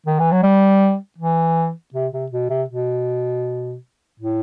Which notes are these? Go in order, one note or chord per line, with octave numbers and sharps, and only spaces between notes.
D#3
E3
F#3
G3
E3
C3
C3
B2
C3
B2
A2